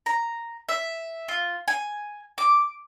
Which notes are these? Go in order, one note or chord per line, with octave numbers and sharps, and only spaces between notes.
A#5
E5
F4
G#5
D6